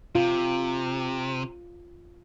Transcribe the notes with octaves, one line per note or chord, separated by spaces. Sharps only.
C3 F4